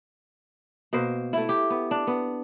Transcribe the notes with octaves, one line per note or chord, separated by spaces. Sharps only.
B2 A#3 C5
A3 E4
G4
B3
D4
B3